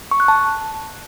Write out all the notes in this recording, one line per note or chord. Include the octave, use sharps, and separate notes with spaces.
C#6
F#6
A5